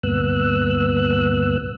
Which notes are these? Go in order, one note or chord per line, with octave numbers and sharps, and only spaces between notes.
D2 G2 A#2 B3 E6 F#6